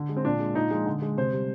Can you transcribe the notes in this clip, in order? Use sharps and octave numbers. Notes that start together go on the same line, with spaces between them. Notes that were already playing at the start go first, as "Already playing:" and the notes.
Already playing: D3
G#3
C4
A#2 D4
G#3
A#2 D#4
F3 G#3
D3
G#3
C3 C5
G3